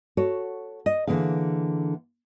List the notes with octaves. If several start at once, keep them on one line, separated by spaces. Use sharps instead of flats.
F#4 A4 C#5
D#5
D3 E3 A#3 G#4 F5